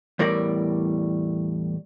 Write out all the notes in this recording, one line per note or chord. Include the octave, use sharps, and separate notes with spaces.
E2 A2 G3 A#4 D5